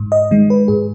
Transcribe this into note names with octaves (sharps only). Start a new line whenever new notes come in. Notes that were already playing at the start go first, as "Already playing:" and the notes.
Already playing: G#2
D#5
D#3 G#3
B4
G#2 G#4